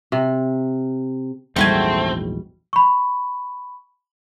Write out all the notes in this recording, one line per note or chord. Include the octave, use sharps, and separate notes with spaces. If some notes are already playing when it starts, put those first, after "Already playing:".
C3
A#1 E2 G#2 G3 A3 C4 F#4 G#5
B5 C#6